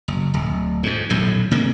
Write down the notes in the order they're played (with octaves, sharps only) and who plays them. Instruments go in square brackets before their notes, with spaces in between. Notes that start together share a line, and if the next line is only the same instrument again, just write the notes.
[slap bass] F#1
D1
F2 G#2
D#1 B1 F#2 A2
C3 G#3 A#3